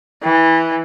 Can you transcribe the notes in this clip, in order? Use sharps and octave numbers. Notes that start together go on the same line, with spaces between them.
E3